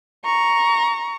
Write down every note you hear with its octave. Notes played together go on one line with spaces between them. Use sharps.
A#5 C#6